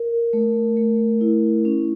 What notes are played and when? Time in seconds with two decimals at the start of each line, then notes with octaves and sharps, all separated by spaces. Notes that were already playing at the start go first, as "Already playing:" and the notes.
Already playing: A#4
0.33 A3
0.77 A3
1.21 E4
1.65 C#4